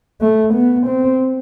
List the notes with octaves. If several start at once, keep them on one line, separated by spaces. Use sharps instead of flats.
A3
B3
C4